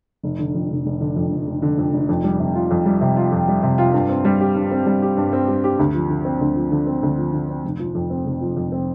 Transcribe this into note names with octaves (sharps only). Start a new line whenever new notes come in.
F1
D3
F2
F1
F1
D3
F2
F1
F1
D3
F2
F1
F2
G3
C3
F4
F2
G3
C3
F4
F2
G3
C3
F4
G2
C4
G3
G4
G2
C4
G3
G4
G2
C4
G3
G4
D2
F3
D3
C4
D2
F3
D3
C4
D2
F3
D3
C4
F1
F3
F2
C4
F1
F3
F2
C4